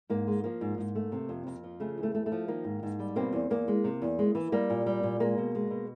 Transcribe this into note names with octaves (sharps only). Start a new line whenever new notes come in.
G#2 A#3
G#3
F3 A#3
G#2
G#2
A3
C3
F2
F2
F3
C#3 A3
E2
A3
A3
A3
F3
D#3 A#3
G#2
G#2
G3
B2 A#3 C4
E2
E2 A#3
G#3
C3
E2
G#3
E3
G3 A#3
A#2
G3
A#2
G#3 A#3
B2
G#3
B2